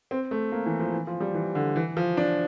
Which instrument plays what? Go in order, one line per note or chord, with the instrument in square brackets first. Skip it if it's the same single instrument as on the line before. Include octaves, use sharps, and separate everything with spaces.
[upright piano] C4
A3
A#3
E3
F3
E3
F3
G3
E3
D3
E3
F3
D4